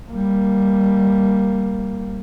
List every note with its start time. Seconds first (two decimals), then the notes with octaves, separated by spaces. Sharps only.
0.11 G3 A#3